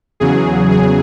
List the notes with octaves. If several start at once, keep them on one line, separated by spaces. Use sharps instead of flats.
E2 C#3 F#3 G#4
G#4